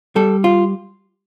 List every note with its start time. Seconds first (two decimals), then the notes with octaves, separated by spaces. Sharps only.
0.16 G3 A4
0.44 F4